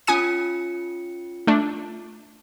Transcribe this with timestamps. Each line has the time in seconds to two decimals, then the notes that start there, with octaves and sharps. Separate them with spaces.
0.07 C#4 F4 G#5 D#6 C#7 D#7
1.47 A3 D4